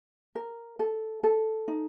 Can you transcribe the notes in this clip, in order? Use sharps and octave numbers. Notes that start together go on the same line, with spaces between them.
A#4
A4
A4
D#4